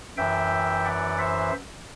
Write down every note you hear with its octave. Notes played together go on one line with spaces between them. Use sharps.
F#2 E3 E5 G5
D5 F#5
C5 E5